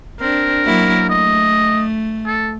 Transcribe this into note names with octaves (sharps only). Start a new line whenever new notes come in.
C4 D4 A#4
F#3 A#3 E4
A3 D#5
A4